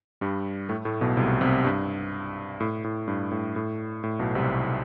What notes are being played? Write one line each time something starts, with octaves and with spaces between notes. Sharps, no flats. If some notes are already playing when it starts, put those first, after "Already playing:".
G2 G3
A2 A3
A2 A3
B1 B2
C2 C3
C2 C3
G2
A2
A2
G2
A2
A2
A2
B1 B2
C2 C3